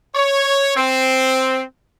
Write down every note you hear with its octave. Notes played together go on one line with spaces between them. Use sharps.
C#5
C4